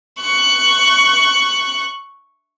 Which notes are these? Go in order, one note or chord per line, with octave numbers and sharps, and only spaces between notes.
C#6 F#6